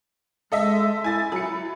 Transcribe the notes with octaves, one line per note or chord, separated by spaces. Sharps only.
G#3 A4 D#5 E5
E4 G#5 A6
F#3 C#7